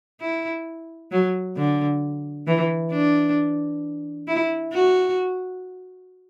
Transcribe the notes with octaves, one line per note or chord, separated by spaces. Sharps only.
E4
F#3
D3
E3
D4
E4
F#4